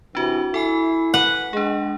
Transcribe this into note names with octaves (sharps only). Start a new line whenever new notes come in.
C3 E3 D4 F#4
E4 A4 G#5 C7
B4 F#5
G#3 D4 G#4